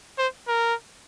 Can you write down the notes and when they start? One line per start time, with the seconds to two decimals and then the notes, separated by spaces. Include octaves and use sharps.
0.18 C5
0.48 A#4